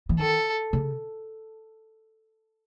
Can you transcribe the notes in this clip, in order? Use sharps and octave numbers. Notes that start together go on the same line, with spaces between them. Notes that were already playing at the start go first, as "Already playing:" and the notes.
E3
D#3 A4
C#3